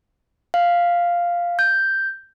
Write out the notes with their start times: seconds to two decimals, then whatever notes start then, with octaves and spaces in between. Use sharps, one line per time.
0.54 F5
1.59 G6